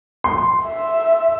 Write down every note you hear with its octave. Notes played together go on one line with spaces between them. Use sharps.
C6
E5